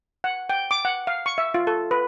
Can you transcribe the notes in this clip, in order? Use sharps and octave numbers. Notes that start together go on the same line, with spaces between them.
F#5
G5
D6
F#5
F5
C#6
E5
F4
A4
B4